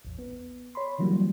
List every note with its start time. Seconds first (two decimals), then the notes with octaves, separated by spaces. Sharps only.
0.05 A1 E2
0.19 B3
0.75 C#5 B5 C6
0.98 D3 E3 F#3 G3 A#3